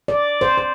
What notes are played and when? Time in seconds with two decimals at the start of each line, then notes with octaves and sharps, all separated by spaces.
0.08 D5
0.41 C5
0.58 C5